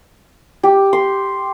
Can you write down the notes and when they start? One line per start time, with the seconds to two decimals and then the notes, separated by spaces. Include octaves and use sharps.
0.63 G4
0.93 C6